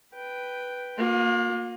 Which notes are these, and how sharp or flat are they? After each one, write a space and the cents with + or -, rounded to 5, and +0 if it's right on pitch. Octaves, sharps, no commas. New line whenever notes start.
B4 +0 G5 +0
A#3 +0 F4 +40